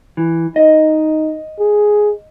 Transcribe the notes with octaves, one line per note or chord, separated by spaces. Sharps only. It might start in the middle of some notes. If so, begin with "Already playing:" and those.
E3
D#4 D#5
G#4